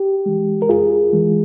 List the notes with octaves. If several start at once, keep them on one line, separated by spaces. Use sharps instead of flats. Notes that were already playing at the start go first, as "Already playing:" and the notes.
Already playing: G4
E3 G#3
A#4
F2 F4 G#4
E3 G#3